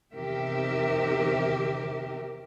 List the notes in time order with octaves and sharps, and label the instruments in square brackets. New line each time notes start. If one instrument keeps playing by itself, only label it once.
[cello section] E2 C3 D#3 G4 A#4 E5